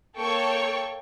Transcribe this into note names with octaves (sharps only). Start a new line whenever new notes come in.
A#3 A4 C#5 G5 C#6